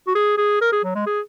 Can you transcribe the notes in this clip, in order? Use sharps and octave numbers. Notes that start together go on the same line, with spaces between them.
F#4
G#4
G#4
A#4
G#4
F#3
G#3
G#4